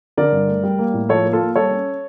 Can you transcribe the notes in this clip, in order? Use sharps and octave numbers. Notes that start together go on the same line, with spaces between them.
D3 A#4 D5
G2
A3
G3
A#3
A2
F3 A4 C#5
A#3
F4 A4
A#3
G3 A4 C#5
C#4